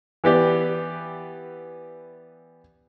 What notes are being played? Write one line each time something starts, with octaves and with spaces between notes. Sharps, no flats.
E3 B3 G4 D5